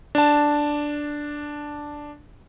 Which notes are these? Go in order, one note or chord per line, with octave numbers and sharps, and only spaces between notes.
D4 A5